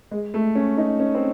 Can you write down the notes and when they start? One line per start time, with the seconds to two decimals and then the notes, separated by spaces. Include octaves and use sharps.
0.11 G#3
0.34 A3
0.55 C#4
0.78 D#4
1.00 C#4
1.15 C4